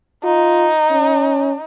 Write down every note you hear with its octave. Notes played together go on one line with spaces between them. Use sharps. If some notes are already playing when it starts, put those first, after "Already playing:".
D#4 F4
C#4